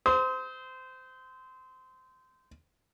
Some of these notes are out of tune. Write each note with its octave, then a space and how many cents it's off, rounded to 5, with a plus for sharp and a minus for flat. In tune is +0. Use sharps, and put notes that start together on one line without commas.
C5 -20 D#6 +45